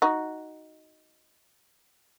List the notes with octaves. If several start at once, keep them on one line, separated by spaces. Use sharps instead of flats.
D#4 F#4